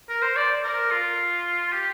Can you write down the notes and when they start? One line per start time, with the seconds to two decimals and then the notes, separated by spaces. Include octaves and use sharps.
0.09 A#4
0.22 C5
0.36 D5
0.64 A#4
0.91 F4
1.72 G4